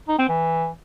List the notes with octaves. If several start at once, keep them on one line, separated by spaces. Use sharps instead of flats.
D#4
C4
E3